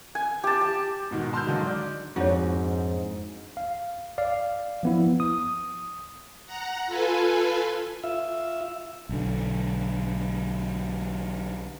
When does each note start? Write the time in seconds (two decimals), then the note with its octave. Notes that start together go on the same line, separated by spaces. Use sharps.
0.15 G#5
0.44 G4 A5
0.61 G4
1.11 G#2 B2 D#3
1.33 A5 C6 E6 F6 G6
1.46 D3 D#3 F#3 G#3
1.67 D5
2.16 F2 G#2 A#3 D4 F4 F#4 C#5
3.57 F5
4.18 D5 F5
4.83 F3 B3 E4
5.20 D#6
6.47 F#5 A#5
6.87 F4 A4 B4 G#5
8.03 F4 E5
9.09 B1 D3